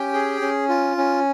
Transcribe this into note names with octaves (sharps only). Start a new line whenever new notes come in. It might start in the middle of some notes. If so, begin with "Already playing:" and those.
Already playing: C#4 G4 G5
G#4
C#4
F4
C#4